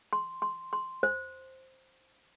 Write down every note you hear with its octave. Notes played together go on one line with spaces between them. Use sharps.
C6
C6
C6
C5